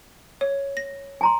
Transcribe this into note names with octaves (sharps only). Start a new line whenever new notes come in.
C#5
A#6
G#5 A#5 C6